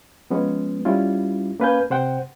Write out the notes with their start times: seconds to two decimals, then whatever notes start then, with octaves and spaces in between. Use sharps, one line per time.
0.30 F3 G#3 B3 C#4
0.85 G3 C#4 E4 F4
1.60 A#3 C#4 B4 F5 G#5 G6
1.90 C3 C5 F#5 G5